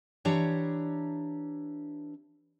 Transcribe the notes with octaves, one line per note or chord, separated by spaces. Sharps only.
E3 D4 G4 C#5 A#5